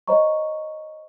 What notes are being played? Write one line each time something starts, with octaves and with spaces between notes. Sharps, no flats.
C5 C#5 D#5 A#5 C#6